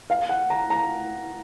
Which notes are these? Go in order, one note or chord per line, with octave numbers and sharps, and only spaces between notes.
F5
F#5
A#5
A#5